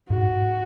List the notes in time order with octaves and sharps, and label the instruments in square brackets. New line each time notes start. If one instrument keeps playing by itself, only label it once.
[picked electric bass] G#2 [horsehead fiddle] F#4